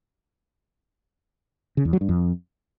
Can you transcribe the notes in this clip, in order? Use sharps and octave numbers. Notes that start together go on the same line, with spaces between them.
C#3
E2
F#3
G2
F2